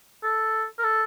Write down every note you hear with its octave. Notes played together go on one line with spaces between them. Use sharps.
A4
A#4
A4